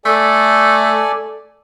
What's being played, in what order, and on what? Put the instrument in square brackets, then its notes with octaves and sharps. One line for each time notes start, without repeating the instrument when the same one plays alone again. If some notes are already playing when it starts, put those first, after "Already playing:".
[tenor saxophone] A3 [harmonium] A4 D5 G#5